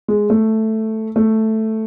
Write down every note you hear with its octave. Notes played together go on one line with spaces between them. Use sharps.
G#3
A3
A3